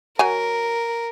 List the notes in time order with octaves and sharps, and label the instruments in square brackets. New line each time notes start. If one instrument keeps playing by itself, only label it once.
[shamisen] F#3 G#5 [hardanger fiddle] A#4